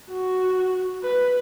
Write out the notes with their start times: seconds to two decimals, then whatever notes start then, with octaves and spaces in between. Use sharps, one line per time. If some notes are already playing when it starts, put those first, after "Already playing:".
0.10 F#4
1.03 B4